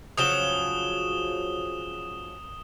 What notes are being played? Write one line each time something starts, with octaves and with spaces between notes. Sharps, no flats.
C#3 F3 F#3 D#6 E7 G7